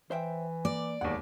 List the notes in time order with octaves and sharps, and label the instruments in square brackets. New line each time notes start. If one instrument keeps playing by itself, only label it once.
[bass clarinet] E3 [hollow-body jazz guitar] C5 E5 G5
[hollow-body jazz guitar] A#3 [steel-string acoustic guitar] D5
[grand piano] E1 D#2 [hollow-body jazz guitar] F#5